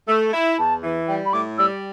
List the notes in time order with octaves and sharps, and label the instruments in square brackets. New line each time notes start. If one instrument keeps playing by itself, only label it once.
[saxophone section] A3 [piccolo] E6
[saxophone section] E4
[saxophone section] E2 [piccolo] A5
[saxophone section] E3
[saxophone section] G3 [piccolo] G5
[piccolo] B5
[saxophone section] A2 [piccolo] D6
[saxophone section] G3 [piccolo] E6